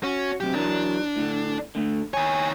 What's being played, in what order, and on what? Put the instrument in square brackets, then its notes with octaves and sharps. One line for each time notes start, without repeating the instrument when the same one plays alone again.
[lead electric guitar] C#4 [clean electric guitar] F#4
[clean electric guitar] B1 F#2 C3 [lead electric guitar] G4
[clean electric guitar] E3 F#3 A#4 [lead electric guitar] D4
[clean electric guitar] A2 D3
D3 A3
[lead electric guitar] D#3 C#5 [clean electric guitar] G#5